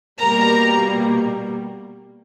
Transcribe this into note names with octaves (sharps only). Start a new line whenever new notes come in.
B2 G3 A#3 A#4 A#5